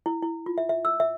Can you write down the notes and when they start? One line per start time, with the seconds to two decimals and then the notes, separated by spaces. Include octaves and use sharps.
0.06 E4
0.22 E4
0.46 F4
0.58 E5
0.69 E5
0.85 E6
1.00 E5